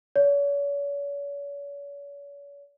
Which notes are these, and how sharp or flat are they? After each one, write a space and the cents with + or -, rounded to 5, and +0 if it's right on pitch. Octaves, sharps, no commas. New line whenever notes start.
C#5 +40